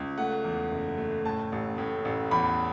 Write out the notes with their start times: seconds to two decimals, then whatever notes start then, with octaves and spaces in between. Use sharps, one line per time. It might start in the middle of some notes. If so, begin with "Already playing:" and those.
Already playing: C#2
0.18 A3 F#5
0.44 E2
0.72 F#1
0.98 A3
1.25 A2 A5
1.52 A1
1.78 A2
2.05 A1
2.31 E2 B5